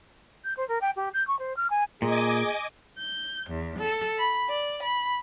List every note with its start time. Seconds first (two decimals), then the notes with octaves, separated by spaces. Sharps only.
0.44 G6
0.57 C5
0.68 A#4
0.81 G5
0.96 G4
1.13 G6
1.27 C#6
1.39 C5
1.56 F6
1.70 G#5
2.02 A#2 G#4 D#5 G#5 D6
2.98 G6
3.49 E2
3.79 A4
4.19 B5
4.50 D5
4.83 B5